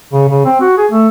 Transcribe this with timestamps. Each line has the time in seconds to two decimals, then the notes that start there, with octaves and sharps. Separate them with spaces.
0.13 C#3
0.28 C#3
0.46 C4
0.61 F#4
0.78 G#4
0.91 A3